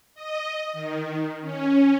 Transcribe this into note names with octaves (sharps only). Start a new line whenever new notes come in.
D#5
D#3
C#4